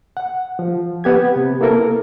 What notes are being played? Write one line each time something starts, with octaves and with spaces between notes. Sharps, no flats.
F#5
F3
B3 G4 G#6
C3
A#3 B3 E4 A4 A#4